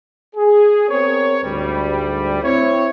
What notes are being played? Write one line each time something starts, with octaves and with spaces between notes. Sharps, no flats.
G#4
B3 C4 A#4 C#5
D2 G#2 G3
C4 E4 C#5